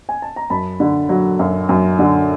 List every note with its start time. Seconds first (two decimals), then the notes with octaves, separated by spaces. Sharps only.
0.09 G#5
0.22 A5
0.36 A#5
0.50 F#2 A5 B5
0.80 D3
1.09 F#3
1.39 F#2
1.69 F#2
1.99 D3